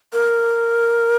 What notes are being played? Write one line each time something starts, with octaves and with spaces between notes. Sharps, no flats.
A#4